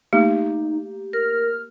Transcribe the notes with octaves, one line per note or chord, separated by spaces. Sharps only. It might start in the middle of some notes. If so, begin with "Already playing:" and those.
A3 A#3 D#4 G4
A#4 F6